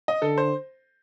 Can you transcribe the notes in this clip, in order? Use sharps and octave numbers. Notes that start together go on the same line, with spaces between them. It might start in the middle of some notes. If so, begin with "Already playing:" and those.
D#5
D3 A4
C5